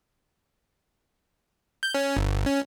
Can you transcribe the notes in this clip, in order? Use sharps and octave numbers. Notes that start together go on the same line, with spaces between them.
G6
C#4
G1
C#4